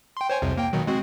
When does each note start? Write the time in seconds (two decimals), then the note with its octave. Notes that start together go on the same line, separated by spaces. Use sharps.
0.17 G5 C6
0.30 C5 C#5 G#5
0.42 C2 F2 C3
0.58 A#3 G5
0.73 B2 D#3 F#3
0.87 G#3 C4 F#4